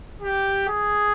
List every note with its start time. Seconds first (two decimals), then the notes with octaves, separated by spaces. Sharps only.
0.22 G4
0.68 G#4